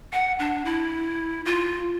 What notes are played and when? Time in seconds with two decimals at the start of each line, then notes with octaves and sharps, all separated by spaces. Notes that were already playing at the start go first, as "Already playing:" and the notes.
0.13 F#5
0.39 D4
0.65 E4
1.45 F4